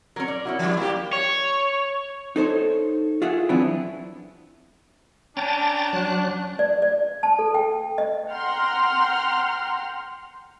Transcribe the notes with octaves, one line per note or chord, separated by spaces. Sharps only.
F#3 C#4 A#4
D5
C#4 E4 F#4
F3 G3
A#3 G4
C#5
D#4 A4 C5 C#5
F4 G#4 E5 F#5
E3 F#3 B3 C4 D4 E4
C#4 D4 G5 A5 A#5 A6
F#3 F#6
D5
D5
A5
A4
G5
D#5
F#5 G5 A#5 C6 F6